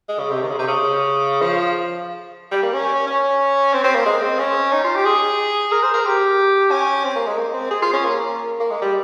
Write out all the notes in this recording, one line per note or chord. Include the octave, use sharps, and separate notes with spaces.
G#3
C#3
C3
D#3
C#3
C3
C#3
F3
G3
A#3
C#4
C#4
C4
C4
A#3
G#3
C4
C#4
D#4
F4
G4
G#4
A#4
C5
A#4
G4
C#4
C4
A#3
G#3
A#3
C4
G#4
F4
C#4
A#3
A#3
G#3
G3